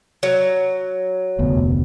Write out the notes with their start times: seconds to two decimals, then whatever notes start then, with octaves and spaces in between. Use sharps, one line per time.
0.23 F#3
1.39 F1 D2 B2